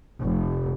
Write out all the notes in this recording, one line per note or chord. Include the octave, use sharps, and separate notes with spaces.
F1